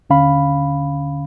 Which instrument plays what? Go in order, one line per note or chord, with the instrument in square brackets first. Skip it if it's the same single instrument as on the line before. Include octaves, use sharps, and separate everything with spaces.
[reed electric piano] D#2 D3 C#4 F5 B5